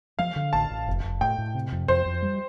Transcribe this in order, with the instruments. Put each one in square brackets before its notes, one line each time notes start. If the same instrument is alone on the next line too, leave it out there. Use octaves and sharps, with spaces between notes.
[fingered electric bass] F3 [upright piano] F5
[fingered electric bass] D3
[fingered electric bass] A1 [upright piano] A5
[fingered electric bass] A1
F1
F1
[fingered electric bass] A2 [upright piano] G5
[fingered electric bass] A2
C3
F2
[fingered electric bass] F2 [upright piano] C5
[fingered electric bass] F2
G3